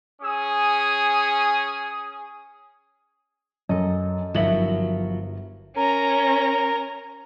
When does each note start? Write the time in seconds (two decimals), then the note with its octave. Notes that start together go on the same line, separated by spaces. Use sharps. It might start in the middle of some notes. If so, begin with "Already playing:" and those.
0.22 C#4 G#4 D#6
3.69 F#2 A4 D#5
4.34 G1 F3 F#3 E4 F#4 A#4 E5 F#7
5.77 C#4 A#4 A#5